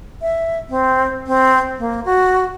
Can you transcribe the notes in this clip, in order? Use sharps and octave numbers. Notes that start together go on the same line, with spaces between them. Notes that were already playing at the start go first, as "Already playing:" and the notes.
E5
C4
C4
A#3
F#4